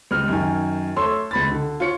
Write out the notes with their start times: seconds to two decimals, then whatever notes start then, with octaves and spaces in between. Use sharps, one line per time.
0.11 C#2 G3 F6
0.28 F#2 D#3 G#5
0.96 A3 C#5 C6 E6
1.31 C#2 B5 A6
1.52 D3
1.80 F4 C#5 C#7